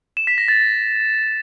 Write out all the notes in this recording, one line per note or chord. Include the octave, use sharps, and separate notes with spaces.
E7
B6
A#6
A6